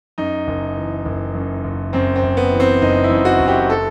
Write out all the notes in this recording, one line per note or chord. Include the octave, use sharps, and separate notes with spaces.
F#2 D#4
F#1
E3
F#1
F#2
F#1
F#2 C4
C4
F#1
B3
E3
C4
F#1 D#4
E4
F#2
F#4
F#1
G4
A4